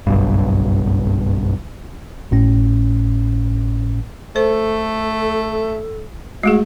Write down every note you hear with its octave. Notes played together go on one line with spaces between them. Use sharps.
F#1 B1 G2
G#1 A2 C#4
A3 A4 C5
G#3 A3 F#4 G#4